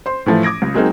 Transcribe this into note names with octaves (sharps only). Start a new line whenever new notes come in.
C5 C6
A2 E3 F3 A3
D6 D#6 G#6 A#6 D7
C#2
F#3 G#3 A#3 C4 D#4 G#4